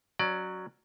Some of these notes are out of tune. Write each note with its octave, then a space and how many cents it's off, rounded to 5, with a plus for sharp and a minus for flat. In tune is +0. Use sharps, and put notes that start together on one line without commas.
F#3 +0 C#4 +10 D5 +25